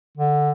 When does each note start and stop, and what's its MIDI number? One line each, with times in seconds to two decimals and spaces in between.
0.17 0.51 50